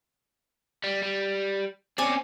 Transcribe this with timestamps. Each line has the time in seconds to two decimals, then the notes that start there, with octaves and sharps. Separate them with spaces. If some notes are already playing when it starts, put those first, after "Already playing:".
0.84 G3
1.03 G3
1.98 C4 C#4 D5 G#5